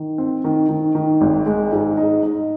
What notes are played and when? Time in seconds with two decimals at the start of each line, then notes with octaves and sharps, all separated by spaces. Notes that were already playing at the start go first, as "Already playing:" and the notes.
Already playing: D#3
0.18 C4
0.44 D#3
0.69 D#3
0.95 D#3
1.21 G#1
1.46 G#3
1.72 G#2
1.97 D#4
2.23 D#4